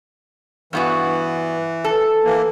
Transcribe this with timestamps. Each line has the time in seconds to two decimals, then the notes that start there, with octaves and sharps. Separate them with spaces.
0.73 G2 E3 B3 F#4
1.84 A4
2.25 E3 A#3